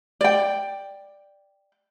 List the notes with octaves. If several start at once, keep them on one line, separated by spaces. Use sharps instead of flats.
D5 G5